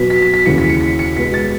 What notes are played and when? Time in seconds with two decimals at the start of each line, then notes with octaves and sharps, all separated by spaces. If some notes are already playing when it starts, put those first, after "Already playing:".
Already playing: B2 F#3 B3 B6
0.10 B6
0.22 B6
0.34 B6
0.46 D#2 C#3 E3 C#7
0.58 B6
0.70 C#7
0.81 B6
0.99 C#7
1.16 B2 G#3 B3 B6
1.34 A6